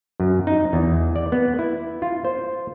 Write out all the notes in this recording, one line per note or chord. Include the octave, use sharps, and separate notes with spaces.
F#2
D#4
E2
D5
B3
E4
F4
C5